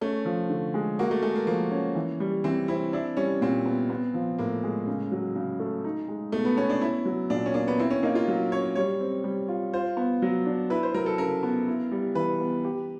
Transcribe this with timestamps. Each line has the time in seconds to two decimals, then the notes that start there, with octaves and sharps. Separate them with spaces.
0.01 A3 C#4
0.25 F3
0.49 D3
0.74 G#3
0.99 A#3 F#4
1.11 A3
1.23 G#3 A3
1.35 A#3
1.47 F3 A#3
1.71 C#4
1.95 E3
2.20 G3
2.44 E3 C4
2.68 C4 E4
2.93 D4 E4
3.17 G3 C#4
3.41 A#2 C4
3.66 B3
3.90 B3
4.14 F3
4.38 A2 A#3
4.64 G#3
4.87 C#3
5.12 F#3
5.36 C#3
5.60 A3
5.84 D#4
6.08 G#3
6.32 B2 A3
6.45 B3
6.57 B3 C#4
6.70 D4
6.81 C#4 E4
7.05 F#3
7.30 A#2 D4
7.46 C#4
7.54 A#3 D4
7.68 B3
7.79 C4 E4
7.90 C#4
8.03 A#3 D#4
8.15 F4
8.28 F#3
8.52 C#4 C#5
8.75 G3 C#5
9.00 C4
9.24 G3
9.48 F4
9.73 F4 C5
9.97 B3
10.22 F#3
10.46 D4
10.70 E4 B4
10.83 C5
10.94 F#3 A#4
11.06 A4
11.18 C#3 A#4
11.43 B3
11.68 E4
11.92 G3
12.15 E3 B4
12.40 B3
12.65 G4